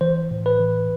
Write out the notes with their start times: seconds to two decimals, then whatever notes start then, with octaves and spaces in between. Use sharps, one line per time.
0.01 E3 C5
0.31 A2
0.46 B4
0.60 E3